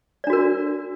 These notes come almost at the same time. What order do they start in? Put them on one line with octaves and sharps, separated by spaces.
D5 D4 F#4 A#4